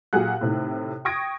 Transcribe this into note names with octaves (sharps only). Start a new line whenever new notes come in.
A#2 F#3 G4 G#4 F#5 F#6
A2 C3 D#3
G5 C#6 D#6 G#6 A#6 D7